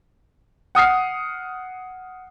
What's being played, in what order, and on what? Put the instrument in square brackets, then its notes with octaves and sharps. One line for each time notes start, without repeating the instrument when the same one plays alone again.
[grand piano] F#5 D#6 F6 C7